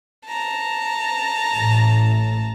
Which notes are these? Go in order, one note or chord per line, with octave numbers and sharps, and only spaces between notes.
A5 A#5
A1 A2